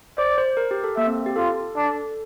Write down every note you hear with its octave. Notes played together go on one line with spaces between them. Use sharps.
C5 D5
C5
A#4
G4
A4
A#3 E5
C4
G4
F4 A4
D4